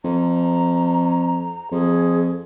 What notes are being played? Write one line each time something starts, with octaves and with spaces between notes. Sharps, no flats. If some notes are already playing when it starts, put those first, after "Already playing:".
F2 A#5
F2 G#4